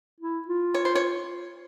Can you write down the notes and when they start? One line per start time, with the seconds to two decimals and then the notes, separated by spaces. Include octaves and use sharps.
0.20 E4
0.48 F4
0.74 C#5
0.85 C5
0.95 C#5